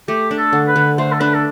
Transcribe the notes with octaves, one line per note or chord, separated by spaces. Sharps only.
A3 G4
D4
A4
D3
B4
D3
A3 C5
A4
D4 B4
A4